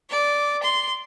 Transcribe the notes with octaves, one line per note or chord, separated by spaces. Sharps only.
D5
C6